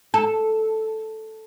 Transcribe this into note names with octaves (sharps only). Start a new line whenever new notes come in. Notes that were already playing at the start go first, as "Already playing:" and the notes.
A4